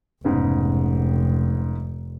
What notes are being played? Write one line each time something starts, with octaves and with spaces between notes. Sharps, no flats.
F1 G#2 C#3 B3